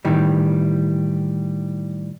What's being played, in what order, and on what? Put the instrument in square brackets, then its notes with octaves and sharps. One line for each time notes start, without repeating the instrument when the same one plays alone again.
[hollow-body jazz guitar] A2 D#3 E3 G3